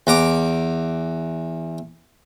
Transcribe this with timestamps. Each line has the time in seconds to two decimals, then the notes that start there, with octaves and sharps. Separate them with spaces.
0.07 E2 A#5 D6